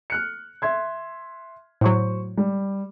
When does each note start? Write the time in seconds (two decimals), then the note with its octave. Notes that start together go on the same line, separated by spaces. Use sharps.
0.10 F6 F#6 C#7
0.62 E5 C6 G#6
1.81 A2 F#3 C5 C#6
2.37 G3